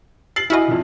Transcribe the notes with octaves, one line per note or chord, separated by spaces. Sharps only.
A6 C7 F#7
E4 F#4 D#5 G#5 F6
A#1 F2